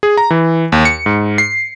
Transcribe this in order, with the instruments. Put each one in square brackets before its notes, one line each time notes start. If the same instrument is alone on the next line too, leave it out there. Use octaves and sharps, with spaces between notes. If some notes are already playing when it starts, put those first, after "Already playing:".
[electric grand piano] G#4
A#5
E3
D#2
C#7
G#2
C7